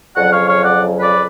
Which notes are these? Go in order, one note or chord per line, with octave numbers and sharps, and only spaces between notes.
F2 C#3 F#3 D5 F#5
C#5 F5
C#5 F5
D5 F#5
B4 D5